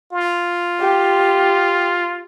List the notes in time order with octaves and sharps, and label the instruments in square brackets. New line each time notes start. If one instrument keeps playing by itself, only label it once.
[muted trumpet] F4
[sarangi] G4